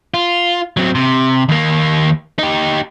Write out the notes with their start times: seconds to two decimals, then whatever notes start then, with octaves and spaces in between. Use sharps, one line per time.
0.14 F4
0.77 F#3 C4
0.95 C3
1.49 D#2 A#3
2.39 D#4 G4